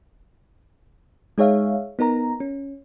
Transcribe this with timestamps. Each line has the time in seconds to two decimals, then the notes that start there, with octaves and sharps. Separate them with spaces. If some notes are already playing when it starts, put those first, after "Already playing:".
1.38 G#3 D#4 G#4 C#5 E5 F5
1.99 B3 D#4 A#4 A#5
2.40 C#4